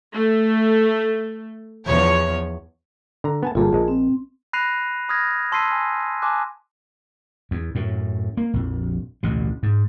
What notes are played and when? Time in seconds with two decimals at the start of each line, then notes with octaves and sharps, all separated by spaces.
0.15 A3
1.86 E2 F3 C#5
3.24 D3 A#5
3.43 B3 G#5 A5
3.55 G1 A#2 F4 G#4 A5
3.73 A#1 G#3
3.88 C4
4.53 B5 F#6 A#6 C7 D#7 F7
5.09 B5 D#6 F6 G#6 A#6
5.52 A5 C6 E6 B6 C7 D#7
5.72 G#5
6.22 G#5 A5 C6 D6 F#6
7.51 E2
7.75 F#2 A2
8.37 A#3
8.54 A#1 F2
9.23 A1 D2 B2
9.63 G#2